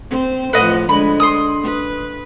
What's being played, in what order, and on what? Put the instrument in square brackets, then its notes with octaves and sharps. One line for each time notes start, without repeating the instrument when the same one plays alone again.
[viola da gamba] C4 C5
[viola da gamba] A2 F3 [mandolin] B4 D#5 F#5
[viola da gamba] D3 G#3 [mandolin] B5
[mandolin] C6 D#6
[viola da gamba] B4